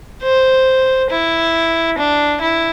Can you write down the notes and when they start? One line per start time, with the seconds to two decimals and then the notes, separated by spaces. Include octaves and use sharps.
0.23 C5
1.10 E4
1.98 D4
2.41 E4